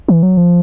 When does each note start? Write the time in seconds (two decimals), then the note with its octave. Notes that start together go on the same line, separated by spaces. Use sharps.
0.08 E3
0.23 F#3
0.37 F3